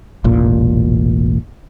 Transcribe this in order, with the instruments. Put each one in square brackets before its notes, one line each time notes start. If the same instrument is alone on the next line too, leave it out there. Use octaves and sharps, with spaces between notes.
[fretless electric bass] E1 A1 A#2